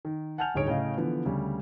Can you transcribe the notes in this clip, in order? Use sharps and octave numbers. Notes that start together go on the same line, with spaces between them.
D#3
F#5 G#5 A5 F6 G6 F7
D1 G1 D#4 G#4 C#5 D7
A2 C#3 D#5 F5
D3 E3 F3 B3
D2 C#3 G3